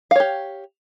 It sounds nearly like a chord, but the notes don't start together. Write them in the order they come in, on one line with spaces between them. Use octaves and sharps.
F5 C#5 G4